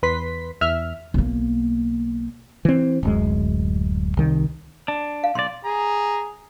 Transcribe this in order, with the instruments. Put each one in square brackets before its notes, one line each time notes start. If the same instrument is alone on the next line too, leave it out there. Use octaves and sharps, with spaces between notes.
[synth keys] E2 B4 C6 B6
E2 E5 F6
[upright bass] B1 A#3
[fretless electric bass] E3 C4
D1 F#2 G#3
C2 D#3
[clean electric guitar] D4
[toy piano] F5
[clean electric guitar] B1 D5 [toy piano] C6
[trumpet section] G#4 A#5